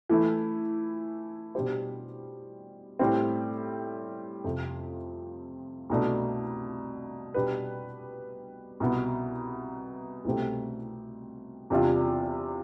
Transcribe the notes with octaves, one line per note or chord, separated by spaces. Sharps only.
E3 A3 E4
B2 G3 D4 G4 C5
A2 G3 C4
F2 C3 F3
C2 B2 A3 D4
B2 G3 D4 G4 B4
C2 B2 B3
C2 B2 A3 C4 G4
E2 C3 G3 D4 F4